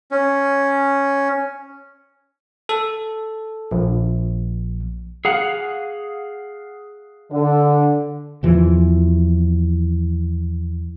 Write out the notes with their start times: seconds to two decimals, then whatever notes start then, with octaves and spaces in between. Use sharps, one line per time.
0.11 C#4
2.69 A4
3.71 A#1
5.25 G#4 F5 F#5
7.32 D3
8.43 E2 E3 F3